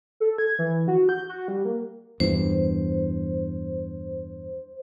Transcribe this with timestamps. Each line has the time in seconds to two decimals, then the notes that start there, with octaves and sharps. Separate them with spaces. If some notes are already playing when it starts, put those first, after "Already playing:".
0.20 A4
0.38 G#6
0.59 E3
0.88 F#4
1.09 G6
1.29 F#4
1.48 G3
1.65 A#3
2.20 E2 G2 E3 C5